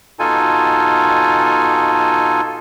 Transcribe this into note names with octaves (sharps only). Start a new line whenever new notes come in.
B2 D#4 F4 A4 G#5